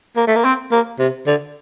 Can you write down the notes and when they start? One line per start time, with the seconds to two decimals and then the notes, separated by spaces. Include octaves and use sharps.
0.17 A#3
0.27 A3
0.36 A#3
0.44 C4
0.72 A#3
0.99 C3
1.26 D3